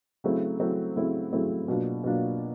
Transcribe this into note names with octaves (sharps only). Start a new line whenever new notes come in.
C#3 F#3 A3 C4 E4
C#3 F#3 A3 C4 E4
C#3 F#3 A3 C4 E4
C#3 F#3 A3 C4 E4
B2 F#3 A#3 D4 F4
B2 F#3 A#3 D4 F4